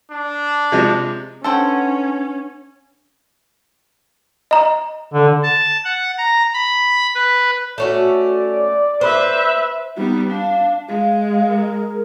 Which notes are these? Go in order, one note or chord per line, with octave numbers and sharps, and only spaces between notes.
D4
C3 F3 G#3
B3 C#4 D4 A4 C5 F#5 G5
D#5 A#5
D3
A5
F#5
A#5
B5
B4
A3 C#4 F#4 D5
B4 C5 E5
G3 B3 D#4
D4 F5
G#3 F5
G#4 A#4